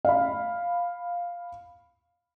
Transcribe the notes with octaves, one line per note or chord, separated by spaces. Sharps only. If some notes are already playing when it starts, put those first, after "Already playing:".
F5 B5